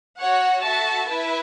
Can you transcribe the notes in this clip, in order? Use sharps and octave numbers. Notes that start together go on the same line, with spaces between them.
F#4 C#5 F#5
F#4 A4 E5 A5
E4 B4 E5